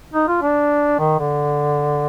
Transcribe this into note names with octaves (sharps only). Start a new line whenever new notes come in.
D#4
F4
D4
D#3
D3